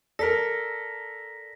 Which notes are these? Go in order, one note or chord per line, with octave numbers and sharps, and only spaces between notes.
A4 A#4 D5 A#5 A#6 B6